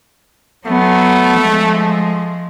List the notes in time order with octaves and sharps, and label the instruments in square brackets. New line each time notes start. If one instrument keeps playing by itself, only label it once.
[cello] F#3 B3 [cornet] A3
[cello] F3 G#3